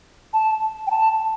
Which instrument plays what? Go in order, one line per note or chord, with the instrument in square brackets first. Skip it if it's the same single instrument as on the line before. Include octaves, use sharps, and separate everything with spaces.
[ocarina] A5
G5
A5